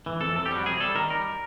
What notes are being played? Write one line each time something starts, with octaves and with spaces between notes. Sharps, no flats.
E3
F2 A4
F2 A4
G4
G3 F#4
C3 G#4
G3 A4
D#3 A#4
G3 A#4